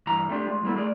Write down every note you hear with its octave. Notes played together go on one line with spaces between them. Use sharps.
G2 E3 A#5
A3 C4 D4 F4 G4
G#3 F4
G3 A#3 B3 E4 A4
A3 F4 G#4 A#4 D5